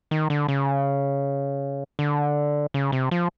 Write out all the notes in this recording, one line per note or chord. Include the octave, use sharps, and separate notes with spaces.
D#3
D3
C#3
D3
C#3
C3
F3